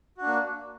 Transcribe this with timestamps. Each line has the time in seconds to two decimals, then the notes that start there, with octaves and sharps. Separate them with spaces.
0.17 F#4
0.22 D4
0.26 A#3